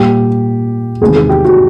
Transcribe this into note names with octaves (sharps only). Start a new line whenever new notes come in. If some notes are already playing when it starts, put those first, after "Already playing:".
Already playing: A#2 G3 G4
E2 C3 D#3 G#3 G#4
G#4
G4
F#4